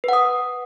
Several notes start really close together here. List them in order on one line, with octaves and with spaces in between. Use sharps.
B4 F#5 D#6